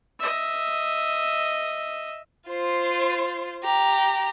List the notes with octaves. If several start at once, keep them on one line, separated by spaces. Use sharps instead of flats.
D#5 E5
F4 C5
G4 A#5